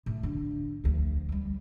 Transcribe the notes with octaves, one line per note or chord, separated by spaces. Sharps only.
A2
D3
D2 F3
F#3 G3